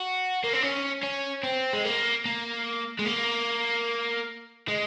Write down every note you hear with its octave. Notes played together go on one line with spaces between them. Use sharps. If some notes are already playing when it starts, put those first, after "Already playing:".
Already playing: F#4
A#3
C4
C#4
C#4
C4
G#3
A#3
A#3
G#3
A#3
G#3